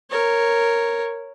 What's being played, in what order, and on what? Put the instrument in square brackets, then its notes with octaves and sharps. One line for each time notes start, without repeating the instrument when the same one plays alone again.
[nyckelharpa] A#4 C#5